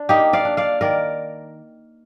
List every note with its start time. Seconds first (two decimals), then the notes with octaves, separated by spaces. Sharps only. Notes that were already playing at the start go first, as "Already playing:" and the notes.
Already playing: D4
0.09 A#3 D#4 G4
0.33 D5 F5
0.45 D4
0.57 D5 F5
0.81 D#3 A#4 D5